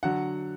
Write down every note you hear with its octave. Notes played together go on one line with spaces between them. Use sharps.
D3 F#3 F#5